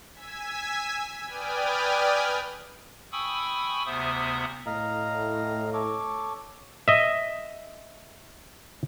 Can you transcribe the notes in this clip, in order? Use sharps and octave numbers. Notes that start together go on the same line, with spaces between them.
G#5 E6 G#6 B6
B4 D5 G5 G#5 D#6 F6
G5 G#5 B5 C#6 D#6 E6
D2 C3 B3 C5 E5 D#6
A2 D#5 F5 A#5
A4 C#5 D6
D#5 E5